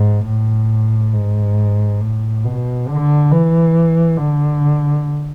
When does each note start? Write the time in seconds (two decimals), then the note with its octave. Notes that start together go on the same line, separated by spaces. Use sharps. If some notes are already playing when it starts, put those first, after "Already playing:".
Already playing: G#2
0.26 A2
1.13 G#2
2.01 A2
2.44 B2
2.88 D3
3.31 E3
4.18 D3